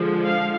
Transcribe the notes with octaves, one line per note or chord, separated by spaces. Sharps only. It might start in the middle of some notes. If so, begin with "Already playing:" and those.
Already playing: D3 F3 G#3
F5